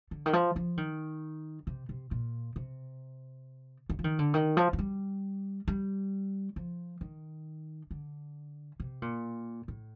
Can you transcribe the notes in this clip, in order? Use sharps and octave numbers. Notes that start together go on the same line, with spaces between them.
D3
D#3
F3
F3
D#3
C3
C3
A#2
C3
D3
F3
D#3
D3
D#3
F3
F3
G3
G3
F3
D#3
D3
C3
A#2
A2